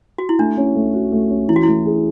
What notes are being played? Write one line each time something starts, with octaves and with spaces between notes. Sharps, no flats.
F#4
E4
A3 D4
C#4
A3
F#4
A3
C#4
E3 E4
F#4
A3 E4
G#4